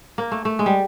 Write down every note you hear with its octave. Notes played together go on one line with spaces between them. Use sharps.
A#3
A3
A3
G#3
G3